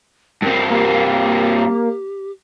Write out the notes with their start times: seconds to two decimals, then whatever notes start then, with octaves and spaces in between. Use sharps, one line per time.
0.42 G2 C4 A#4
0.70 A#3 G4